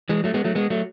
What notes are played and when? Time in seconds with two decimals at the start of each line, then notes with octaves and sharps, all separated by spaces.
0.09 E3 G#3
0.24 F#3 A3
0.34 G#3 B3
0.45 F#3 A3
0.55 G#3 B3
0.70 F#3 A3